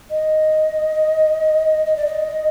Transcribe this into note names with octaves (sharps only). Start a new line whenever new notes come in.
D#5
D#5
D5
D#5